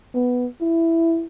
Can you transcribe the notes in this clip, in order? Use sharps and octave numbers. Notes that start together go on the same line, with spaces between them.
B3
E4